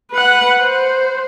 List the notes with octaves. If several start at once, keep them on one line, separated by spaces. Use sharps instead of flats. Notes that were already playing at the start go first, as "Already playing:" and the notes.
B4 F#5
C5